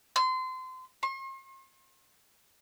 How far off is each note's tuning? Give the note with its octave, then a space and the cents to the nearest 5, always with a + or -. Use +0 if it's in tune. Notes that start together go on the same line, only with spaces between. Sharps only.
C6 -25
C6 +45